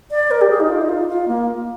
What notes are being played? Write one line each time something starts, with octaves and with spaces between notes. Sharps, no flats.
D5
A#4
G4
G#4
D#4
F4
D#4
F4
F4
A#3